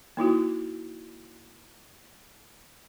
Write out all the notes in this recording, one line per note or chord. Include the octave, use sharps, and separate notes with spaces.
A#3 D#4 E4 F#4